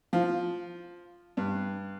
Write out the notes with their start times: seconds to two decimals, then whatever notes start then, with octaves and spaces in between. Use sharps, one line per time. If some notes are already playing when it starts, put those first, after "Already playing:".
0.13 F3
1.37 G2